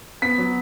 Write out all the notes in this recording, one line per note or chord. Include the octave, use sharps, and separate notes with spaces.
B3 B6
F#3